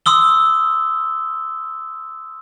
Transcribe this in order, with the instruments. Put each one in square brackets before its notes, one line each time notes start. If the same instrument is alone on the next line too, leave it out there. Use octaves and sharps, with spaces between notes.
[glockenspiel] C6 D#6 E6 G7